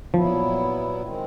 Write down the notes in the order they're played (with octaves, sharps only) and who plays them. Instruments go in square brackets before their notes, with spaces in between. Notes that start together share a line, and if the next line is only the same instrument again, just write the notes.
[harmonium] A#2 F#3 B3 E4 [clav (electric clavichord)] F3
[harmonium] D#3 G#3 C4